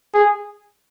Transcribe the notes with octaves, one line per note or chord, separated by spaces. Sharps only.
G#4